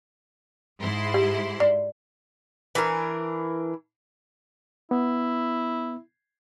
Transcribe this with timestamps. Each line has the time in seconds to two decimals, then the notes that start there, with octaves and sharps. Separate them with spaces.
0.80 G#2 E4 C6
1.14 G4
1.60 D5
2.75 E3 D4 A#4
4.91 B3 E4